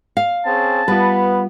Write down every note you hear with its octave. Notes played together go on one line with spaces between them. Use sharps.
F5
C4 C#4 G#4 A5
G3 B3 F4 B4